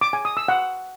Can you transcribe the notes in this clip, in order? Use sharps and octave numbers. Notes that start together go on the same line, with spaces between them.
D6
G#5
D#6
E6
F#5